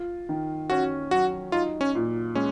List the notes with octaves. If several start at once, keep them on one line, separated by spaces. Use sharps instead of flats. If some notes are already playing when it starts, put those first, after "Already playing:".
Already playing: F4
D#3
C#4 F#4
F#3 F#4
D#4 F4
C#4
A#2
G#3 C#4